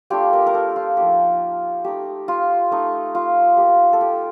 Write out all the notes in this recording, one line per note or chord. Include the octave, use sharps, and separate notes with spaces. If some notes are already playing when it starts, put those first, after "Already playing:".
A3 D4 F4 G4
A#4
A#4
A4
F4
F3 A#3 D#4 G4
A3 D#4 G4
F4
A3 D#4
F4
A#3 F4 G4
A4
G4